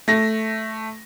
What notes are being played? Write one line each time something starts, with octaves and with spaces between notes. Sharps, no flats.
A3 A#6